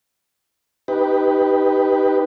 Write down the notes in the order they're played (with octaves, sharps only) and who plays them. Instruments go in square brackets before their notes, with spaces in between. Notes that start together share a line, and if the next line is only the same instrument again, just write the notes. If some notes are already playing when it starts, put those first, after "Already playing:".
[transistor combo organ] D#4 G4 B4